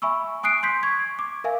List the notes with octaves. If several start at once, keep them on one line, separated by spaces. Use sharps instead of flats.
E5 G#5 B5 C#6 E6
G#5 D#6 F#6 C7 D7
C6 G6 B6
C#6 G#6
D6
A#4 E5 F5 G#5